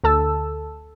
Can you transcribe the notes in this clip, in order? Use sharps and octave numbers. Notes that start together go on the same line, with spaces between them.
D2 A4 A5 E6